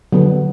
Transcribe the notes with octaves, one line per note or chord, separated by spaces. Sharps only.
D3 F#3 B3